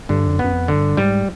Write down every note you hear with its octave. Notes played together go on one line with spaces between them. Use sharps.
G2 D3
F2
F#2
B3
F#2
F2
D3
G2
G#2 G3